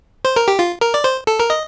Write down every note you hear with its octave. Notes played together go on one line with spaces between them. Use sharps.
C5
A#4
G4
F4
A#4
D5
C5
A4
A#4
D#5